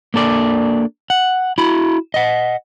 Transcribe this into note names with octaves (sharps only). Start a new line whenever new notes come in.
A#3 D4 A4 D5
F#5
E4 F#4 B5
D#5 F#5